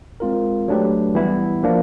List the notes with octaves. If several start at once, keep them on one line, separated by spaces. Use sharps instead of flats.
G#3 C4 F4 A#4
F#3 A3 D4 G4 B4
E3 G3 B3 E4
F3 A#3 D4